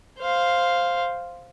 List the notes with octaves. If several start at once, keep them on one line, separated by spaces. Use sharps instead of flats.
C5 F5